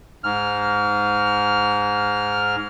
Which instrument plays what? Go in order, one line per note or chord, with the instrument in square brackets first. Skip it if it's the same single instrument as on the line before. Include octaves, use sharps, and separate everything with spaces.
[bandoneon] G#2 F6